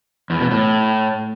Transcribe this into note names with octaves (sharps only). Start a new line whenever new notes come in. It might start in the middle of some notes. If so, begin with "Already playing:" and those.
E2
B2
A2